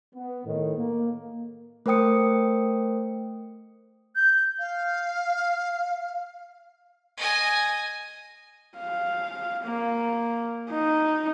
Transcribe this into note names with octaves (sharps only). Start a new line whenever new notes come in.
B3
A2 D#3
A#3
A3 A#4 C5 G5 D#6 C#7
G6
F5
D#5 G#5
F5
A#3
D#4